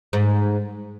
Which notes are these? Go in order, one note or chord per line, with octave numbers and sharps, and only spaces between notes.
G#2